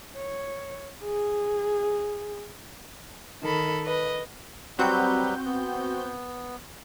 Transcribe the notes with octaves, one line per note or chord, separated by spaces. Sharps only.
C#5
G#4
D#3 A4 B5
B4 D#5
F#3 G3 C4 F#4 B4 G6
B3